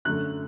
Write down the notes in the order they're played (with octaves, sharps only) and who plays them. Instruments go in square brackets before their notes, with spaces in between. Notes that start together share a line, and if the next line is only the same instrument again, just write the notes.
[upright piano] F#2 D3 F#3 A3 F#6